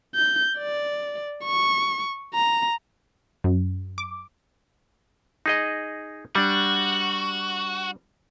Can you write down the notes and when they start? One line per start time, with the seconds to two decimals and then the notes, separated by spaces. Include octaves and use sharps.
0.15 G6
0.59 D5
1.45 C#6
2.34 A#5
3.44 F#2
3.98 D6
5.46 D#4 G#4 D#5
6.35 G3 D4 F#4